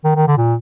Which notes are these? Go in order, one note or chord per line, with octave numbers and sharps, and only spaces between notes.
D#3
D#3
D3
A#2